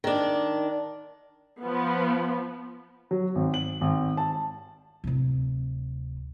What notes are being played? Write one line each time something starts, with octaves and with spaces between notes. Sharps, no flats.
D#3 D4
F3 B3
F#3
G#1
F#7
G#1
A5
D1 C3